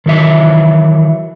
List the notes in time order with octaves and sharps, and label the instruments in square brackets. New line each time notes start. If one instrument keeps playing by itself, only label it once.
[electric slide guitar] D#3 E3 F#3 E5